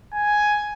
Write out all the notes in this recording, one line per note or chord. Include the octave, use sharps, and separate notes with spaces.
G#5